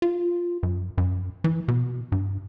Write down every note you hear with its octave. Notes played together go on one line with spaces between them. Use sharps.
F4
F#2
F#2
E3
B2
G2